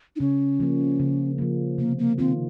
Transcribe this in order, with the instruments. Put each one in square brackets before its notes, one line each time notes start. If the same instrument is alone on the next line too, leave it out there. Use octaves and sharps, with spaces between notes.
[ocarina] D#4
[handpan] C#3 [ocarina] C#4
[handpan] F3 A#3
C#3
F3 A#3
[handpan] C3 [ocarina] A#3
[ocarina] A#3
[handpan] D#3 A#3 F4 [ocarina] C4